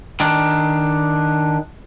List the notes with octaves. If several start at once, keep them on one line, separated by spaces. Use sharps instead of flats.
D#3 D4